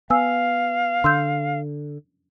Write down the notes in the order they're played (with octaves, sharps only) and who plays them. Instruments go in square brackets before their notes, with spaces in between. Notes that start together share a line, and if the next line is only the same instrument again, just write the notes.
[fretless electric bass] B3 [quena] F5 [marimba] G#5 E6
[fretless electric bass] D3 [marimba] C6 E6 G6